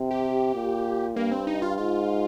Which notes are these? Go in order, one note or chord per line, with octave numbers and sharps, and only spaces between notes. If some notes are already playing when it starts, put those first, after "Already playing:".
Already playing: C3
G4
A#2
G2 A#3
C4
D#4
F4
G#2 F4